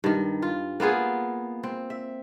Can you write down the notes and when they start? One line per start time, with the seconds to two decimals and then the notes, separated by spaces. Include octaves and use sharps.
0.04 G2 D#3
0.42 F4
0.80 A#3 B3 F4 G#4
1.63 C4
1.90 E5